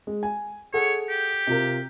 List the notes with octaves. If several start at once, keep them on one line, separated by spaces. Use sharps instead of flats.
G#3
G#5
G#4 A4 C#5 F#5
G4
C3 F4 A#4